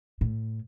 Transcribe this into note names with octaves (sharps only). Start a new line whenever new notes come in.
A2